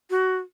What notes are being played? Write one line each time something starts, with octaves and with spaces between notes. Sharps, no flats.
F#4